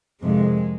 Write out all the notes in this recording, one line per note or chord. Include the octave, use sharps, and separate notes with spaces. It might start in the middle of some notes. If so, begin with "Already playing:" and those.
F2 C3 D#3 G#3